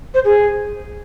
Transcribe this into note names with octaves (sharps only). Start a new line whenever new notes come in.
C5
G#4